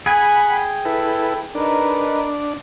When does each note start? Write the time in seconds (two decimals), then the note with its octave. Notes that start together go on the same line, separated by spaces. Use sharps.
0.06 G#4 F#5 G#5 B5
0.51 G5
0.85 E4 A4 B4
1.55 D4 D#4 A#4 B4